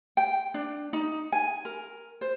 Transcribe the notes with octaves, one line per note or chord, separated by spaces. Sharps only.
G5
D4
D#4
G#5
A#4
C5